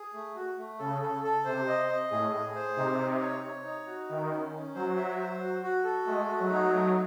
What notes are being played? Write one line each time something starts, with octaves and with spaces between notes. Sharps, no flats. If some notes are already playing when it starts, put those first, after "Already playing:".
Already playing: G#4
A3
F#4
A3
C#3 A4
A4
A4
C3 C5
D#5
D#5
A2 G#4
G#4
C5
C3 D#4
D#4
C#5
C#5
D#4
F#4
D#3 E4
C#4
C#4
F#3 C5
E5
C5
F#4
F#4
A4
G#3 A3
F#4
F#3
D#4
A3